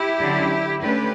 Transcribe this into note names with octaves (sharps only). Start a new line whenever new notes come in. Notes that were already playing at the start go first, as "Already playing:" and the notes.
Already playing: E4 G4
D3 F#3 C#4
D3 A3 C#4 G4 B4